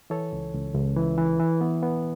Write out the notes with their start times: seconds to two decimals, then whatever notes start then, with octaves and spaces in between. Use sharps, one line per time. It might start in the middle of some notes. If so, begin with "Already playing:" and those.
0.10 E3 A4 C#5
0.33 C#2
0.54 C#2
0.75 C#2
0.96 E3
1.18 E3
1.40 E3
1.61 B3
1.83 B3